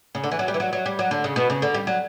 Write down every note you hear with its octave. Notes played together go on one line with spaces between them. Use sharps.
C#3
D3
E3
F#3
G3
E3
F#3
F#3
G3
F#3
D3
C#3
B2
C#3
D3
G3
F#3